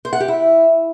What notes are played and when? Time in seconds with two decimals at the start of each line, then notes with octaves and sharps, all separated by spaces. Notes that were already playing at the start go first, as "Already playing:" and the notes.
0.05 C5
0.13 F#5
0.20 G4
0.28 E4